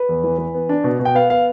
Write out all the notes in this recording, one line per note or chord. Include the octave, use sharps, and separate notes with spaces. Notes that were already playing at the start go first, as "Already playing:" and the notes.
Already playing: B4
E2
E3
E3
B3
D4
B2
B2
G5
B3 F5
B3 F5